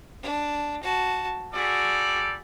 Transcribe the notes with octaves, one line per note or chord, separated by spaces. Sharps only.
D4
F#4 A5
G3 F#4 G#4 A4 D5